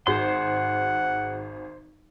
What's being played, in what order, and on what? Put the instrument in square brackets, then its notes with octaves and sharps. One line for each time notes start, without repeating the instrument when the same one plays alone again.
[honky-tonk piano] G#1 F#4 G#4 [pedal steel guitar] C5 C6 [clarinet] F#5